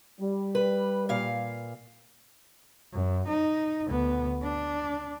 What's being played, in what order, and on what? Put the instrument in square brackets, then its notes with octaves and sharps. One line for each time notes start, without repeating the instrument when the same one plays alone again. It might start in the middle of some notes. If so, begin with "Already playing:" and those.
[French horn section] G3
[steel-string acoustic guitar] B4
A#2 F5
[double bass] F#2
D#4
D2 B3
D4